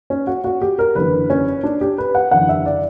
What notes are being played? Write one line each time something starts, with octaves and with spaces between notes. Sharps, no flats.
C#4
F#4
F#4
G4
A#4
F#1 E2 D3 B4
C#4
D4
G4
B4
F#5
F#1 E2 D3 F#5
E5
D5